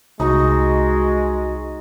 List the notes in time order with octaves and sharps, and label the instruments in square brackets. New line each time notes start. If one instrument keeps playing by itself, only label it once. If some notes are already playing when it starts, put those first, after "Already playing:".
[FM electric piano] C2 [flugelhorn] G#3 [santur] D#4 [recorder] F#4